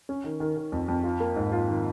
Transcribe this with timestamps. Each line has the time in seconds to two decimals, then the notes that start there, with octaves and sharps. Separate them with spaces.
0.09 C#4
0.24 D#3
0.40 D#3
0.57 D#3
0.72 F2
0.88 F2
1.04 F4
1.20 A#3
1.36 G#2
1.52 F4
1.68 D#3